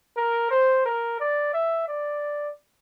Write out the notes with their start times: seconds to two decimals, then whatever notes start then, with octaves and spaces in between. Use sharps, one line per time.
0.17 A#4
0.51 C5
0.85 A#4
1.20 D5
1.53 E5
1.88 D5